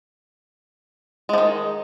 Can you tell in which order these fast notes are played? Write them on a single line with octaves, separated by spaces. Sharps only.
G#3 F3 D#3